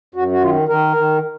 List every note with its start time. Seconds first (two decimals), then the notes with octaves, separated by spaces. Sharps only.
0.15 F#2 F#4
0.31 F#4
0.42 D#3 F4
0.69 D#3 A#4
0.97 D#3